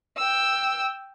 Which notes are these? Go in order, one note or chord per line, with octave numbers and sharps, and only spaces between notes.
G5 E6